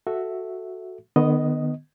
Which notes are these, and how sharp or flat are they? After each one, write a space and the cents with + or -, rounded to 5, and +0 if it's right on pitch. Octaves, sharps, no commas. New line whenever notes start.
F#4 +0 A4 +0 E5 +0
D#3 -45 B3 +0 D#5 +0